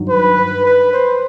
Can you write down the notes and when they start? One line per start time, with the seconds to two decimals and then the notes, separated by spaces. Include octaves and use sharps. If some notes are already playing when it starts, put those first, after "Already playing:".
Already playing: G2 D#3 F#3
0.09 B4
0.65 B4
0.93 C5